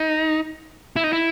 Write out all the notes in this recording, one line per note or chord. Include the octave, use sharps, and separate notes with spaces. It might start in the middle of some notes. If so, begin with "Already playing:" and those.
Already playing: D#4
E4
D#4
E4